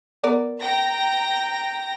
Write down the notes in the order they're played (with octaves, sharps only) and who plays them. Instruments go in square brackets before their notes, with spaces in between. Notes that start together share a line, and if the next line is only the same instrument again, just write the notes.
[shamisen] B3 A#4 D5
[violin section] G5 A#5 A#6